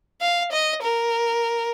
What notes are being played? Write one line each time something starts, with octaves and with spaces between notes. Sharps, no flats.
F5
D#5
A#4